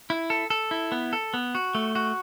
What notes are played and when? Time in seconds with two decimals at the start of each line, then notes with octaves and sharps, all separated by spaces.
0.10 E4
0.30 A4
0.50 A4
0.71 E4
0.92 B3
1.13 A4
1.34 B3
1.55 F#4
1.75 A3
1.95 F#4